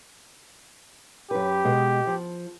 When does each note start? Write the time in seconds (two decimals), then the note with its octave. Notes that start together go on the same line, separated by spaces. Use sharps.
1.31 F#2 G4 B4
1.65 B2 G#3
2.07 F3